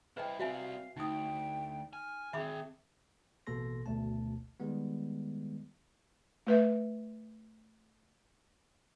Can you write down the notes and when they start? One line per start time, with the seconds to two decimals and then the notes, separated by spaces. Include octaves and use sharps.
0.17 E4 B4 C5 D#5 G5
0.39 G3 C4 F#4 E5 F5 G#5
0.96 D2 D#4 G5 D#6
1.93 G#5 F6
2.33 D#3 C4 G#4 E5 B5 D6
3.47 A1 B2 A#3 A4 C6 A#6
3.86 G#1 D2 B2 A3 A5
4.60 D#3 G3 G#3 B3
6.47 A3 B4 E5